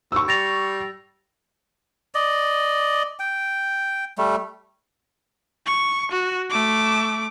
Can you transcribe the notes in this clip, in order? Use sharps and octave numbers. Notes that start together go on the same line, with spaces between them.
D#2 C#6 E6
G3 A6 A#6 F7
D5 D#5
G5
G3 A3
C#6
F#4
A3 D6